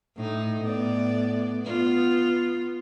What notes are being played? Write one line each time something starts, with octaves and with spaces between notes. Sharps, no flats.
A2 D#4
A2 B3 D5
B3 F4